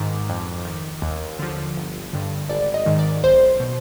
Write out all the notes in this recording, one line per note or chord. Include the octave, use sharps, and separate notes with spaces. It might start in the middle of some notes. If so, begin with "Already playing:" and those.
Already playing: G#2 D#3 D6
F2
D#3
D#2
D3 F3
G1
G2 D3
G#1 D5
D#5
G#2 D#3
D5
B1 C5
B2